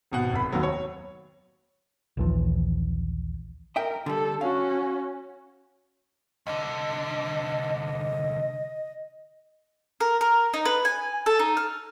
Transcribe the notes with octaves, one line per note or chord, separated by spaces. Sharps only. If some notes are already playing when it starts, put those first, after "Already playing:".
G#1 B2 F#5
F1 B5
D#2 F#3 B3
C#5
A#1 D#2 E3 F3
A#4 D#5 E5 G5
D3 G3 A4
C#4 F#4 F5
C2 D3 D#5
A#4
A#4
D#4
B4
G#5
A4
D#4
F6